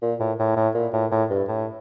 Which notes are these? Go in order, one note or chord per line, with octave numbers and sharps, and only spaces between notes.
A#2
A2
A2
A2
A#2
A2
A2
G2
A2